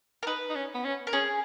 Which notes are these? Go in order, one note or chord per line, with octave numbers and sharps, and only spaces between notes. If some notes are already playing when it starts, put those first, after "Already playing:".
A#4
D#4 B4
D#4
C#4
B3
C#4
A#4
C#4 G#4